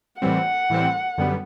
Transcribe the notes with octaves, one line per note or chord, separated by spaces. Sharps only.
A2 E3 G3 C4 F#5
A2 E3 G3 C4
F#2 D3 G3 B3